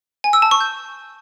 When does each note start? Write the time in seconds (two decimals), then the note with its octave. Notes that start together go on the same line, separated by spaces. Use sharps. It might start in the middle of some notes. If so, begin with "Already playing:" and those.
0.24 G#5
0.33 E6
0.42 A5
0.51 C#6
0.60 G6